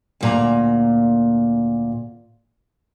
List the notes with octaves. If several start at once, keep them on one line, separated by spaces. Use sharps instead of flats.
D2 A#2 A#5